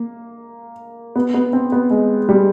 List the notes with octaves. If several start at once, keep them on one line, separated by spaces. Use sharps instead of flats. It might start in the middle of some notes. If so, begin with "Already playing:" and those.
Already playing: A#3
B3
B3
C4
B3
G#3
G3